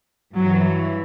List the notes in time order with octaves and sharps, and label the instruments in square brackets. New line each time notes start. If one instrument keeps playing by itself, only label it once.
[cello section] G2 E3 F#3